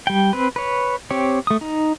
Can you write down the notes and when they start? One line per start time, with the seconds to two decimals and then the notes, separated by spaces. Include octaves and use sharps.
0.07 G3 G5
0.33 C4 B4
0.56 B4 C#5
1.11 C4 G4 C#5
1.47 A3 D#6
1.61 D#4